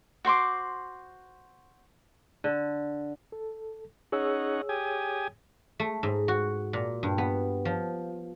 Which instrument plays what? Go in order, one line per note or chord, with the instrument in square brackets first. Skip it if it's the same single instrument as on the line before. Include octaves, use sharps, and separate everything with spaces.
[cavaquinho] F#4 C5 C6 D6
[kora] D3
[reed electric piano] A4
[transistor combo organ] C#4 D#4 F#5 [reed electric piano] G#4 C#5 E6
[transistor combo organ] G4 G#5 D#6
[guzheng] A3
G#2
F#4
A#2
G2
B3
F3